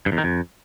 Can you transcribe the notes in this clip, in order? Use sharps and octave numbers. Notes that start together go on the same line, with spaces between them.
G2
E2
D#3
F2